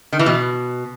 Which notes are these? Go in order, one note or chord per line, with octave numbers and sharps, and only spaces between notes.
D#3
E3
B2